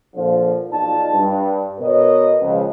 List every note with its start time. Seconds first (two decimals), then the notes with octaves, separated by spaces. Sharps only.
0.14 A#2 D3 F3
0.71 B1 D#4 F4 D5 A5
1.13 G2
1.79 B2 A#4 B4 C#5 D#5
2.40 C#2 F3